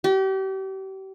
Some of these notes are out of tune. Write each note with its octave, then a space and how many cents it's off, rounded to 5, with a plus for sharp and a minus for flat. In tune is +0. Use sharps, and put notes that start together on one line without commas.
G4 -35